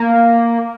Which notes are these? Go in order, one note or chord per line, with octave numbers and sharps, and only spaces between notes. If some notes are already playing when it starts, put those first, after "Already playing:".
Already playing: A#3